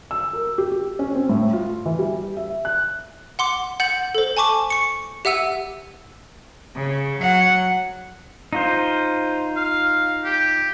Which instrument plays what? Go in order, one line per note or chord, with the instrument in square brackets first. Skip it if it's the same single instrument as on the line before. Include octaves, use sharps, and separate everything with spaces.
[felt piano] E6
A#4
G4
G4
C#4
C4
A2
F4
E3
G3
E5
F#6
[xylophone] F#5 C6 D6
F#5 G6 A6 F#7
A4 C5
G#5 A5 C#6 D6
C#6 C#7
G4 E5 F#5 E6 D#7
[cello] C#3
F#3 F#5
[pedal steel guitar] D#4 F4 C5
[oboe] F5
G4